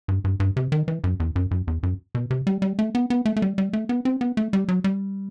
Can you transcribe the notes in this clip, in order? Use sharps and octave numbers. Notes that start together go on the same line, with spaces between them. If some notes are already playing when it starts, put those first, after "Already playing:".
G2
G2
G2
C3
D#3
E3
F#2
E2
F#2
F#2
E2
F#2
B2
C3
G3
G3
A3
B3
B3
A3
A3
G3
G3
A3
B3
C4
B3
A3
G3
F#3
G3